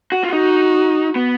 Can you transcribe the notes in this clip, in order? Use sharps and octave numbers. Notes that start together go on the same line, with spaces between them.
F#4
F4
D#4 F#4
B3